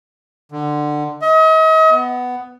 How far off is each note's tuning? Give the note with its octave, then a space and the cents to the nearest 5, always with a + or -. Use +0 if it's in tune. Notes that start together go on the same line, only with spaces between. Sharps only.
D3 +20
D#5 +40
B3 +10